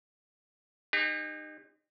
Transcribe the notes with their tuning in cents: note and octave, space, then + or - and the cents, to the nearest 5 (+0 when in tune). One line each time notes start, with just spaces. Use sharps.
D#4 -25 G4 +40